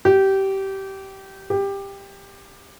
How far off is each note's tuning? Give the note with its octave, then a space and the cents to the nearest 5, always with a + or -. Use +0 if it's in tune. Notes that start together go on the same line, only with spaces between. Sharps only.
G4 -20
G4 +15